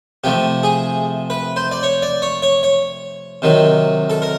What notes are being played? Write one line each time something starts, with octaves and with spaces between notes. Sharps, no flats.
C3 F3 A3 G4
G#4
B4
C5
D5
C#5
D5
C#5
C#5
C#5
C3 D#3 F#3
A4
A#4